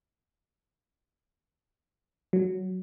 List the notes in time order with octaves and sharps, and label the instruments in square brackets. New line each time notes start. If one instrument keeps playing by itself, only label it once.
[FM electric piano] F#3